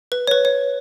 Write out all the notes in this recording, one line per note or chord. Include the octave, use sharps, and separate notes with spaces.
B4
C#5
B4
C#5